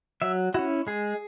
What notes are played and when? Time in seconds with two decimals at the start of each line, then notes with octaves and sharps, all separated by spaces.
0.22 F#3 E5
0.54 C#4 E4 F#4
0.87 G#3 G#4